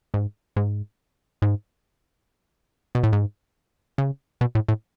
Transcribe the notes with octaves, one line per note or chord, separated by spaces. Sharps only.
G#2
G#2
G#2
B2
A2
G#2
C#3
B2
A2
A2